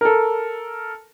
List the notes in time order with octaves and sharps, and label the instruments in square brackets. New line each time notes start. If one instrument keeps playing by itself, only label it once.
[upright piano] A4 A#4